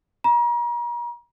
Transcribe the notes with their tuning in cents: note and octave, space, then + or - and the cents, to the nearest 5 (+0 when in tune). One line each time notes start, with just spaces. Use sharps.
A#5 +40